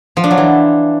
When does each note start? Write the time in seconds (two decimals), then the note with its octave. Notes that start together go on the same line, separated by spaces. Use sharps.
0.17 F3
0.24 D4
0.31 F#3
0.37 E3